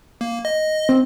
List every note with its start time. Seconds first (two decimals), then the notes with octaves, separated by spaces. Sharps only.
0.21 A#3
0.45 D#5
0.89 C4